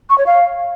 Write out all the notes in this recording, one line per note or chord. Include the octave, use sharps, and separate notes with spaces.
C#6
C#5
F5